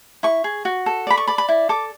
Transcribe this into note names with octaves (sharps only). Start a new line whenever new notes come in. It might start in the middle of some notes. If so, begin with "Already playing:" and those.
E4 C#6
G#4
F#4
A4
D5 B5
C#6
D5 B5
B5
E4
A4 D6